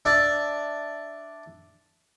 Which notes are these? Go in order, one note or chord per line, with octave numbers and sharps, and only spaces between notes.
D4 E5 A5